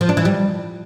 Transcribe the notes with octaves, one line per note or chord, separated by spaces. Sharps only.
F3
D4
E3
G3